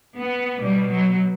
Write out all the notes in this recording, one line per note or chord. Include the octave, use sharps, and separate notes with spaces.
B3
B2 G3
F#3